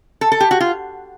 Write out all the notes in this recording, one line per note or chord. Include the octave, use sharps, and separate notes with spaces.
A4
A4
G4
F#4
F4